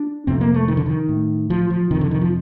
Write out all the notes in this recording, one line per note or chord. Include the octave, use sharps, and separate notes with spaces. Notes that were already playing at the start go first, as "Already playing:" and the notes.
Already playing: D4
F2 C3 C4
A#3
A3
D#3
D3
D#3
A2
F3
F3
F2 C3 D#3
D3
D#3
F3